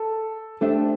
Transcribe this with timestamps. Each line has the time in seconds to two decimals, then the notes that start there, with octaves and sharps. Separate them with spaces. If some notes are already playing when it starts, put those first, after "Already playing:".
Already playing: A4
0.61 A3 D4 G4 A4 C5 E5